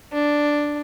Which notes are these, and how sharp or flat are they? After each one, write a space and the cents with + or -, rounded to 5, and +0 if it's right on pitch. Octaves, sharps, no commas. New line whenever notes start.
D4 +0